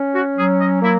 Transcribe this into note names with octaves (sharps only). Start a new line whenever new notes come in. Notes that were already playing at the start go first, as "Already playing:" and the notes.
Already playing: C#4
F#4
F#3 G#4
D#5
A#3 E4